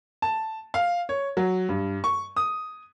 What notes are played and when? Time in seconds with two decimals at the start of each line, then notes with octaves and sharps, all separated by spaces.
0.22 A5
0.74 F5
1.09 C#5
1.37 F#3
1.69 G2
2.04 C#6
2.36 D#6